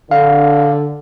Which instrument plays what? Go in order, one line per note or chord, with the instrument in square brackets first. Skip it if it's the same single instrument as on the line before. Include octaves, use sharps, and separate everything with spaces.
[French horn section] D3 [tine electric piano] F5